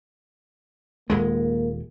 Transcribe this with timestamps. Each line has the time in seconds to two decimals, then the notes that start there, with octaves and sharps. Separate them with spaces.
1.10 D#1 G#3 A#3